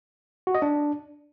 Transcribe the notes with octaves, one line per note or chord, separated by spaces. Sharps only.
F#4
D#5
D4